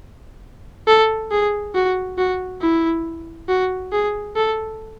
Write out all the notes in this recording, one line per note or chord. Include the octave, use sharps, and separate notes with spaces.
A4
G#4
F#4
F#4
E4
F#4
G#4
A4